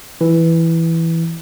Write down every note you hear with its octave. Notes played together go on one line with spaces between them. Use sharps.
E3